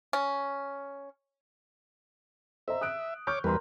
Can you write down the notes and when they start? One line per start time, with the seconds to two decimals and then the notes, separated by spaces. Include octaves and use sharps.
0.13 C#4
2.68 C5 D#5 E5 A#5
2.81 D#6 F#6 D7
3.27 C#5 C#6 D6 F6 G6
3.44 E2 G3 A#4 B4 A#5 C6